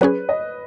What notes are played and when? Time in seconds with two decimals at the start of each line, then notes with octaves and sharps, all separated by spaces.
0.01 F#3 C#4 G#4 B4
0.29 D#5